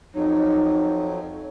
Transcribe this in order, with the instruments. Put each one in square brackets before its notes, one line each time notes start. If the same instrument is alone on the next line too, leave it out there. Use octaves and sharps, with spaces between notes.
[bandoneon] F2 F#3 [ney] D#4